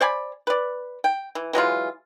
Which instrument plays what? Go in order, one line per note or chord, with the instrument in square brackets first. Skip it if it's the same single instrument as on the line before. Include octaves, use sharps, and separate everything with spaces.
[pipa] C5 D5 G#5 B5
B4 D5
G5
E3
E3 F#3 G#3 F4